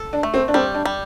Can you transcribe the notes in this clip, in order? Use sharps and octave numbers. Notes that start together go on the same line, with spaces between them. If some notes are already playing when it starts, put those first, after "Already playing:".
Already playing: A4
D4
A3
C4
D4
G3 C4
D4
G3